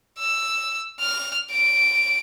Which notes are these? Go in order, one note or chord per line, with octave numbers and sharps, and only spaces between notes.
E6
F6
D7